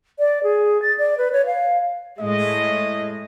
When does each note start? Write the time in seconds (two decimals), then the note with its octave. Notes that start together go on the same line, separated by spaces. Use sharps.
0.19 D5
0.43 G#4
0.82 A6
0.99 D5
1.18 B4
1.32 C#5
1.46 F5
2.19 A2 G#3 D#5